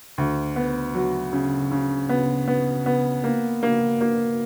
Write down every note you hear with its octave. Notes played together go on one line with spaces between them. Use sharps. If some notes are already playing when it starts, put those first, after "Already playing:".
D2
B3
F#3
C#3
C#3
B3
B3
B3
A#3
A#3
A#3